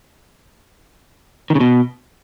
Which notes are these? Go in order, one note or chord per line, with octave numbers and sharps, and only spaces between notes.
D#3
C#3
B2